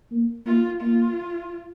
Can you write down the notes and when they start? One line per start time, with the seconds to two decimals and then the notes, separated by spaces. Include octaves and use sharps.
0.11 A#3
0.46 A#3 F4
0.81 A#3 F4